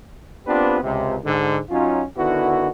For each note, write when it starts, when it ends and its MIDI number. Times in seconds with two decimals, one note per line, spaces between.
0.47 0.80 59
0.47 0.80 60
0.47 0.80 62
0.47 0.80 65
0.47 0.80 67
0.47 0.80 71
0.82 1.17 37
0.82 1.17 48
1.25 1.58 44
1.25 1.58 50
1.70 2.02 54
1.70 2.02 61
1.70 2.02 63
1.70 2.02 65
2.17 2.67 50
2.17 2.67 51
2.17 2.67 59
2.17 2.67 64
2.17 2.67 66